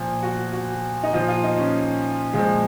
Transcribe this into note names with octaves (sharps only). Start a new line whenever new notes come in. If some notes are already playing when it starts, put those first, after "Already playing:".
Already playing: A#2 F3
F#4
F#4
D#4
A#2 F3 F4
F4
D#4
C#4
A#2 F3 G#3